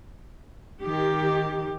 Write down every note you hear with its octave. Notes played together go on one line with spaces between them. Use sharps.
D#3 G4